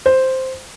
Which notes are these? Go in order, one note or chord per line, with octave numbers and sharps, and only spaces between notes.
C5